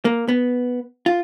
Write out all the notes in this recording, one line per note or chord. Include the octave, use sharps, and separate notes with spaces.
A#3
B3
F4